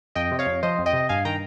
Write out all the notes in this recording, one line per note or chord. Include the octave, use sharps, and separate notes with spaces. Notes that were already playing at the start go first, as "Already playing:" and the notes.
F2 D#5 G5
C3
C#5 F5
F2
F3 C5 D#5
F2
D#5 G5
C3
G2 F5 G#5
D#3 G5 A#5